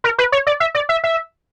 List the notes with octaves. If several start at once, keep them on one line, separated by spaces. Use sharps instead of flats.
A#4
B4
C#5
D5
E5
D5
E5
E5